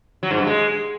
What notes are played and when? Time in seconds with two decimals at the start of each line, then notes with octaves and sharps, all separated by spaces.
0.23 F#3
0.31 G#2
0.39 G2
0.47 G#3